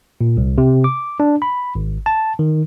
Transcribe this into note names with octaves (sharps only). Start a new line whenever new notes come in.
A#2
C2
C3
D6
D4
B5
G#1
A5
D#3